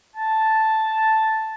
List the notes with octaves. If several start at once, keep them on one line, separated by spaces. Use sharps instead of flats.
A5